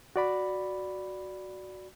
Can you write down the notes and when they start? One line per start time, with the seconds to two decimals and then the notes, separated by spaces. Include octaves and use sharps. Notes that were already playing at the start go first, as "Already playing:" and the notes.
0.16 F#4 D5 B5